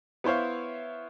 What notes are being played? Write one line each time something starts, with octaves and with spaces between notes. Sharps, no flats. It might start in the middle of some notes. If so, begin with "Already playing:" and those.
B3 E4 C5 C#5 F5